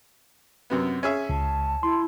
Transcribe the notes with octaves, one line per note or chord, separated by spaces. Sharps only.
F#2 C3 B3
C#4 G#4 E5
C#2 A5
E4 C6